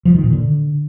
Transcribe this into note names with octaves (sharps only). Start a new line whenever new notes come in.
F3
D#3
A#2
D3